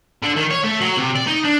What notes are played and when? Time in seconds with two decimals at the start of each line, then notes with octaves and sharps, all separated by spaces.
0.23 D3
0.36 D#3
0.51 C#5
0.64 A3
0.81 F#3
0.97 C3
1.16 D5
1.27 D#4
1.45 D4